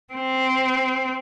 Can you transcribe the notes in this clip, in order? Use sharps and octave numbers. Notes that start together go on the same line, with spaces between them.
C4